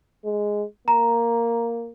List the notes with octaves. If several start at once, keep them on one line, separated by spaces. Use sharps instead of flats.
G#3
A#3 A#5